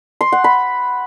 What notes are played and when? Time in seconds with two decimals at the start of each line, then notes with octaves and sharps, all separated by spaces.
0.21 C6
0.32 F#5
0.44 B5